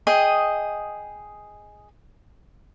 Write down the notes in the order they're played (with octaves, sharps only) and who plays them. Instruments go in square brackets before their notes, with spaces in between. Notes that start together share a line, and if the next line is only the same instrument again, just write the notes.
[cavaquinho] G#4 D#5 G5